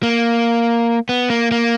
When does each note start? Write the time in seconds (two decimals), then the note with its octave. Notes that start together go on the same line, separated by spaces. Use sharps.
0.03 A#3
1.09 B3
1.30 A#3
1.51 A#3